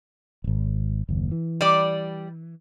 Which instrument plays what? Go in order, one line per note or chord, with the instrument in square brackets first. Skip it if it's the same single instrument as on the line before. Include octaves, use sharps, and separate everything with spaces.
[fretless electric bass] D#1 G#1
F#1 D#2
E3
[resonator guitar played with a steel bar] G3 D5